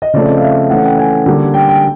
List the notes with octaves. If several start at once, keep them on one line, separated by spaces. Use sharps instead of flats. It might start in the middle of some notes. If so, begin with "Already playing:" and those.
D#5
C#3 F3 A3 C4 D5
D#5
F5
E5
E3 A3 C#4 F#5
G5
G#5
D3 G3 A#3
G5
G5